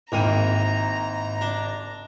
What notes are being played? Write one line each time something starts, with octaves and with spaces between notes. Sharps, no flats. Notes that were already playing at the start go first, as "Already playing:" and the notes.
G#1 G#2 A#3 E4 G5 A#5 D#7
D4